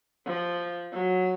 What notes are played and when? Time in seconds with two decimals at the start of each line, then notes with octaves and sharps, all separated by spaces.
0.26 F3
0.92 F#3